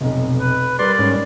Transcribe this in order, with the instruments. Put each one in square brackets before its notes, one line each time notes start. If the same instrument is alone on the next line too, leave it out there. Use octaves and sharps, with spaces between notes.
[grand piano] F1 B1
[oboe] B4
[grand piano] G3 A#4 [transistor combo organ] B4 C6 [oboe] D5
[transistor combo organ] G#2 C#4